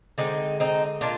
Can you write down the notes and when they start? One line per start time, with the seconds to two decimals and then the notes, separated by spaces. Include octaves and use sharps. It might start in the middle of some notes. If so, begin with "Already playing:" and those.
0.18 D3 G#3 C4 D#4
0.60 C4 D#4
1.01 A#2 D4 F4